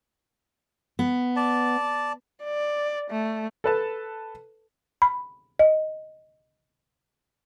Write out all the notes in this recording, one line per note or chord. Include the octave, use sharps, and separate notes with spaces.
B3
D5 A5
D5
A3
A4 B4 A5
B5
D#5